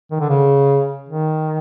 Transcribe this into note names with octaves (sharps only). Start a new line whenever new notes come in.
D#3
D3
C#3
D#3